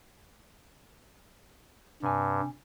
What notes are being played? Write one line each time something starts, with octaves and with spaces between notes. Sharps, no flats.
G2 C3 G#5